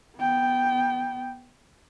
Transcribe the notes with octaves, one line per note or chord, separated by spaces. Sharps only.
B3 G5